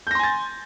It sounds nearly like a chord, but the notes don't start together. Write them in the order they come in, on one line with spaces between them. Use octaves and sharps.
G6 A#6 C6 G#5 A6